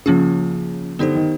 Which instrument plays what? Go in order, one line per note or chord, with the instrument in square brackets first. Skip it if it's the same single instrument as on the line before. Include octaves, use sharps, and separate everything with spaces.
[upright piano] C#3 [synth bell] F3 A#3 C#4 F4 G#4
[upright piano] D3 [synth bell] B3 D#4 G4 C5
[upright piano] D#3